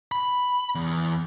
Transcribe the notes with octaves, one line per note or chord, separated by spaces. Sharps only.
B5
E2